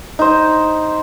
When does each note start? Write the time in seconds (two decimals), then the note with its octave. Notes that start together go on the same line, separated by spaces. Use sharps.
0.19 D#4 C5